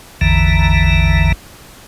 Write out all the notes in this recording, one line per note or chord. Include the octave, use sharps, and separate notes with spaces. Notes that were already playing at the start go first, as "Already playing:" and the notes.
A1 E2 D3 E3 A#5